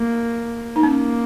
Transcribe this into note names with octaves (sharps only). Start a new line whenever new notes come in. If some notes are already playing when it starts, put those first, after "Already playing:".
Already playing: A#3
D#4
A#3 C#4